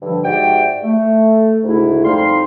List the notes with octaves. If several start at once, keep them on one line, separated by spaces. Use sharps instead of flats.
G2 D3 F3
G#2 F#4 G4 D5 E5 G5
A3
D2 G#2 C#3 A3 E4
F2 G3 C4 D#4 F5 C6